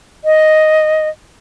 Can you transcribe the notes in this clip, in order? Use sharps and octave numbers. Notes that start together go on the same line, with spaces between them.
D#5